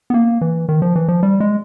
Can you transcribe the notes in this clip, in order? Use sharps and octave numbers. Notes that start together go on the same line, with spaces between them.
B3
A#3
E3
D#3
F3
E3
F3
G3
G#3